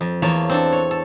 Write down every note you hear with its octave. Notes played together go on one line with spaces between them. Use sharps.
F2
E2 A#3 C#5 A5
C4 D4 A4
C#5
A4